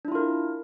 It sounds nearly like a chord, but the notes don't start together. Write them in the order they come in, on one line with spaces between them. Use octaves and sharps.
D4 E4 F4 A#4